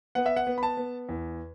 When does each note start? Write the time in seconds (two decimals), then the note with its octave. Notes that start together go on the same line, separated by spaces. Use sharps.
0.15 B3 F#5
0.26 E5
0.36 F#5
0.47 B3
0.58 B5
0.63 A5
0.77 B3
1.09 E2